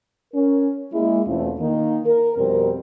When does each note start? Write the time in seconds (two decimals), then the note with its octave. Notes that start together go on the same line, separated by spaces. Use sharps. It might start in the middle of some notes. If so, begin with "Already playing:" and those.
0.33 C#4 A#4
0.92 G#3 A#3 E4
1.27 E2 B2 A3 C4 C#4 F4
1.59 D#3 A#3 D#4
2.06 A#4
2.37 F2 B2 G3 C4 A#4